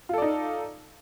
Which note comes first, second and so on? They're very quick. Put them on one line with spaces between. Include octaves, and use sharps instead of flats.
F4 A4 D5 D#4